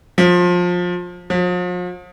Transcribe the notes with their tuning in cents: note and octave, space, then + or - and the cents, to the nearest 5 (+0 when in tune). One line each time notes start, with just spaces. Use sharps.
F3 +25
F3 +45